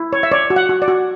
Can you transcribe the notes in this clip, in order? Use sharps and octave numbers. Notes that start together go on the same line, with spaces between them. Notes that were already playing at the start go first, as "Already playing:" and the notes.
Already playing: E4
C#5
E5
C#5 D5
F#4
F#5
F#4
D5
F#4